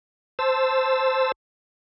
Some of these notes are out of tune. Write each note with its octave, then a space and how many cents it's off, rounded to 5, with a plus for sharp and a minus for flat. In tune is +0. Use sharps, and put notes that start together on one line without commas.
C5 +0 A5 +0 E6 +0